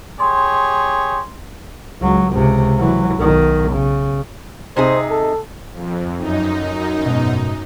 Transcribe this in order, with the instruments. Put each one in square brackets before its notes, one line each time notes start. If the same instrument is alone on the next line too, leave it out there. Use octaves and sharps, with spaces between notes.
[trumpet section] G4 G#4 C#5 [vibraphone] C6
[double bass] C#2 F#3
C#2 C3
E3 F#3
B1 D#3
C#3
[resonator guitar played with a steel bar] C3 D#4 G#4 [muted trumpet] C5
[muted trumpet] A4
[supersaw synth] F2
F#2 D#4
[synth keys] G#2 B2